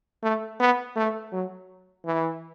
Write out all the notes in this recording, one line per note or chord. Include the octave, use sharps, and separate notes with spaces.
A3
B3
A3
F#3
E3